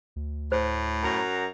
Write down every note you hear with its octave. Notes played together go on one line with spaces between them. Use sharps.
D2
A2 C5
F#2 A#5